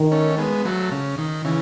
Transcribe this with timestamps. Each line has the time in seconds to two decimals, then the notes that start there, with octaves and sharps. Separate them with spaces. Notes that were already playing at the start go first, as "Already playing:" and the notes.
Already playing: D#3
0.11 A3 C#4
0.38 G#3 B3
0.65 F#3 A3
0.92 C#3
1.18 D#3
1.45 C#3 E3